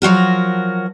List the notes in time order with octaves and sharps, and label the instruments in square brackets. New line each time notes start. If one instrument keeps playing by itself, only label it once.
[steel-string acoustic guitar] F3 F#3 F#4 A#4